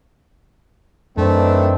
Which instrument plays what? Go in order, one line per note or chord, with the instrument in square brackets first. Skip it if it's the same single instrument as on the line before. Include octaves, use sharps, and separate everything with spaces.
[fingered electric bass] F#2 [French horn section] D#3 E3 D4 [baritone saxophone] A3 [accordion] C4